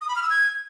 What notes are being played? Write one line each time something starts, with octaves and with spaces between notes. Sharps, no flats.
D#6
B5
F6
E6
G#6